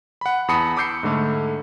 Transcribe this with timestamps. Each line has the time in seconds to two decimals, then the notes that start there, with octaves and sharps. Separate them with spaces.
0.21 F#5 B5
0.48 E2 A5 B5 D#6 C#7
0.77 B5 D6 E6 G6 C7 C#7
1.03 G#2 D3 A3